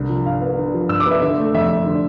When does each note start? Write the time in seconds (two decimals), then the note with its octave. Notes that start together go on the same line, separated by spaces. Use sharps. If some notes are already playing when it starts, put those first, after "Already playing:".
Already playing: C2 D3
0.10 F3
0.26 G2 F5
0.42 B3
0.58 D3
0.74 F3
0.89 G2 E6
1.00 D6
1.06 B3 E5
1.22 D3 E5
1.38 A3
1.54 F2 E5
1.70 F2
1.86 D3